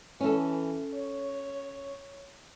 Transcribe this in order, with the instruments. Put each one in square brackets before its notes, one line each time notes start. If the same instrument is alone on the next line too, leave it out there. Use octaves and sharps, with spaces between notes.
[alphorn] E3 [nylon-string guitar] C#4 A4
[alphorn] C#5